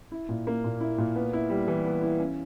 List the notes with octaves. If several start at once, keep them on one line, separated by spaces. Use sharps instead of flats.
E4
A#2
A#3
A#2
E4
A#2
B3
E4
G3
E3
B3
E4
C#4